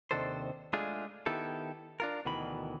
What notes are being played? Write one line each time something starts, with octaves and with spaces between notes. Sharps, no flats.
D#2 C3 D#3 D4 A4 C5
G#3 A3 D4 F4 G#4
D#3 B3 E4 G4 A4
D4 F4 A#4
D2 B2 D#3 E3 B5